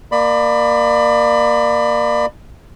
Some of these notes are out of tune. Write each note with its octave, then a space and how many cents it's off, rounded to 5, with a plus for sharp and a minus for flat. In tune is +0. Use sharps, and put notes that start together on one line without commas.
A#3 +0 D5 +30 B5 +20